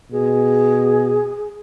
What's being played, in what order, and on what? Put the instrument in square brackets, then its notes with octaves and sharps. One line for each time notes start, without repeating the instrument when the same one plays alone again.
[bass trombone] B2 [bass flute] G#4